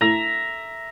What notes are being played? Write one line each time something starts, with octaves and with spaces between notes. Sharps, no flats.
A2 E5 A#5